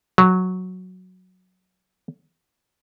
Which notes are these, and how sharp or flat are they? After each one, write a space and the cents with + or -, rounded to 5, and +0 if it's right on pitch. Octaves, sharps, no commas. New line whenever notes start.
F#3 -5